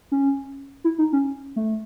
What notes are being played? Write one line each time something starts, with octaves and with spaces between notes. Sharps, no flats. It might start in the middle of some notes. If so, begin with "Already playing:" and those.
C#4
E4
D#4
C#4
A3